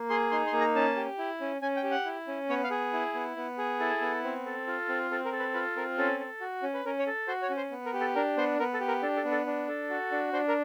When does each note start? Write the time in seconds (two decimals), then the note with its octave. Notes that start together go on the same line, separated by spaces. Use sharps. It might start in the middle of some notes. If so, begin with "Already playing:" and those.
Already playing: A#3
0.09 G#4 C6
0.31 D#4 C6
0.47 C6
0.53 A#3
0.60 A#5
0.75 C#4 A5
0.96 G4
1.18 E4
1.41 C#4
1.62 C#4 G#5
1.77 G5
1.83 G4
1.91 F#5
2.05 E4
2.28 C#4
2.49 B3 C#5
2.64 F5
2.71 G#4
2.93 E4
3.14 B3
3.37 B3
3.58 G#4
3.80 E4 A4
4.01 B3
4.24 C4
4.46 A4
4.67 F4
4.89 C4
5.11 C4 A4
5.25 A#4
5.32 A4
5.39 B4
5.54 F4 B4
5.76 C4 A#4
5.98 C#4 A4
6.20 A4
6.41 F#4
6.63 C#4
6.74 B4
6.85 C#4 A#4
6.99 C#5
7.07 A4
7.28 F#4 C5
7.42 C#5
7.50 C#4
7.57 C5
7.71 B3
7.86 A#4
7.93 G4
8.00 A4
8.15 D4 A#4
8.37 B3 C5
8.59 B3 A#4
8.74 A4
8.80 G4
8.88 A#4
9.02 D4 A4
9.17 A4
9.25 B3
9.31 A4
9.46 D4
9.68 A4
9.90 F#4
10.11 D4
10.33 D4 C5
10.48 A#4